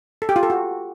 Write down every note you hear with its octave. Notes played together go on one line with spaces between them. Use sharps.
A4
G4
F4
A4
F#4